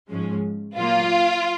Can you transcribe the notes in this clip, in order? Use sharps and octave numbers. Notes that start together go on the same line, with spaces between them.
G#2 F3 G#3 C#4
A#2 F#3 A#3 F4